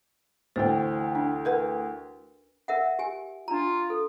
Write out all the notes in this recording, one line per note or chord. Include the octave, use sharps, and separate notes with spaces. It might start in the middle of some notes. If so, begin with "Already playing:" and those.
D2 E3 C5 G5
D4
A#4 B4 F#5
A#4 E5 F#5
G4 G#5
D4 F4 A#5
A4